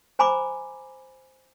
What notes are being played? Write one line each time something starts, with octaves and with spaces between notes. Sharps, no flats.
C5 G#5 A#5 B5 D6